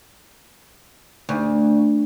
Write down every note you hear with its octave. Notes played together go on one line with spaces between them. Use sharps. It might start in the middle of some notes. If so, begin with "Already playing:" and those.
D2